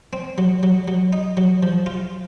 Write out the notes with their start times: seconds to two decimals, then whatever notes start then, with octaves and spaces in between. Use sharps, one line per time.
0.13 C4
0.38 F#3
0.63 F#3
0.88 F#3
1.13 D#4
1.37 F#3
1.63 F3
1.86 F4